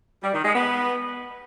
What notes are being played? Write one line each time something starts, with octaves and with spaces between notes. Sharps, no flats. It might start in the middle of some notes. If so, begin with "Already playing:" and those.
G3
D#3
G#3
B3